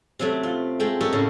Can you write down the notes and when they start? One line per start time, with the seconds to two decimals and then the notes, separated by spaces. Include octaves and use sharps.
0.19 C3 F#3 A3
0.43 F4
0.80 G#3 A3 G5
1.01 F#4 G4 A4 A#4 C#5 D#5
1.13 A2 C#3